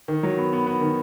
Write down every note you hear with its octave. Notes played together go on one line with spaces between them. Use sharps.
D#3
F#3
B3
B3
B3
D#3